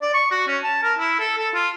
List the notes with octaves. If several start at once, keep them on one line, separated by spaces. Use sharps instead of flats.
D5
C#6
F#4
C#4
A5
A#4
E4
A4
A4
F4